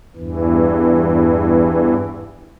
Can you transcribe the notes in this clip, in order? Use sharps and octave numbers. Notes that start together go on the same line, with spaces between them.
E2 G2 E3